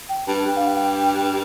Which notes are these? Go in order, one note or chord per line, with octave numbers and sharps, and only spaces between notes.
G5
G2 A5
G2 G5
F5
G5